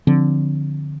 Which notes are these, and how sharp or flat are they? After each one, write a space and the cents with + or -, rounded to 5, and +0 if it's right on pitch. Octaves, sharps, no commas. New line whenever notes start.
D3 +0 F3 +0 C4 +0